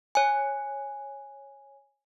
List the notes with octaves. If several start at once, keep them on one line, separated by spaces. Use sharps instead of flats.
C#5 G#5